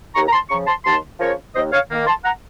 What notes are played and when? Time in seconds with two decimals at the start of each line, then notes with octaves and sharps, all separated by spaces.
0.14 D#2 A#5 C#6
0.27 A#5
0.32 A5 C6
0.50 C#3 F3 A#5 C#6
0.67 A5 C6
0.85 D#2 A5 C6
1.19 C#3 F3 A#4 C#5
1.55 D#2 C5 D#5
1.72 C#5 F5
1.90 D#3 A#3
2.07 A5 C6
2.24 F#5 A#5